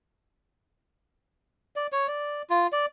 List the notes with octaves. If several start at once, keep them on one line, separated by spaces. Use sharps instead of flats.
D5
C#5
D5
F4
D5